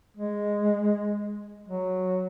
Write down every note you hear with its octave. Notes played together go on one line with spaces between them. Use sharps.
G#3
F#3